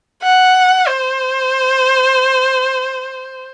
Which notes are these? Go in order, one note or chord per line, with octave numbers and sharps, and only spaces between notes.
F#5
C5